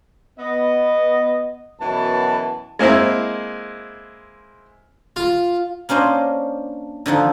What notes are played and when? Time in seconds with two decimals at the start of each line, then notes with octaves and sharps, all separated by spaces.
0.39 B3 D#5
1.80 F#2 B2 E3 A5
2.79 G#3 A#3 C4 E4
5.16 F4
5.89 A#3 C#4 D4 C5 D#5
7.06 D3 D#3 F3 D#4